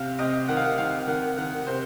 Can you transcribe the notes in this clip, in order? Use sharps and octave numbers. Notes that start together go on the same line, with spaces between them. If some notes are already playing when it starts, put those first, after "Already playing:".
Already playing: C3 F5
C3 D#5
D#3 F#5
F5
F#5
D#3 F5
D#3 F#5
D#3 F#5
C3 C5